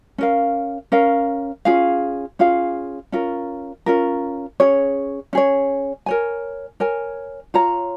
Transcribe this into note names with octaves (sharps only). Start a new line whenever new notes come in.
C#4 A#4 F5
C#4 A#4 F5
C#4 F4 G#4 F5
C#4 F4 G#4 F5
C#4 F4 A#4
C#4 F4 A#4
C#4 G#4 C#5
C#4 G#4 C#5
A#4 C#5 G#5
A#4 C#5 G#5
F4 C#5 A#5